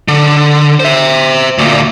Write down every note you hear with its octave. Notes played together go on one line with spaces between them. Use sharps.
D3
C5 E5
D2 A#2